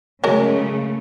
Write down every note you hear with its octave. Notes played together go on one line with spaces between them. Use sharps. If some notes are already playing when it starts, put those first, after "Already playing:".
C#3 F#3 G#3 A3 A#4